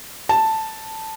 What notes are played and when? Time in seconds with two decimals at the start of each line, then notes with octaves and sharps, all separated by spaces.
0.29 A5